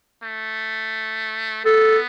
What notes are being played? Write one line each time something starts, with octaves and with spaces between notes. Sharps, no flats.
A3
B3 A4